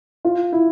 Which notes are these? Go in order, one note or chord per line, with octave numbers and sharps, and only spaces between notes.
F4
E4